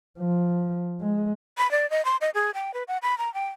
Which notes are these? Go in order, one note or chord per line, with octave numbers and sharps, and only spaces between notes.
F3
G#3
B5
D5
D#5
C6
D#5
G#4
G5
B4
F#5
B5
A#5
G5